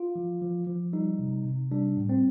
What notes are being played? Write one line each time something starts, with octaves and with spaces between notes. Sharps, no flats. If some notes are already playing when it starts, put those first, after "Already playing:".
Already playing: F4
F3
F3
F3
G3 D#4
C3
C3
G3 D4
A2
C4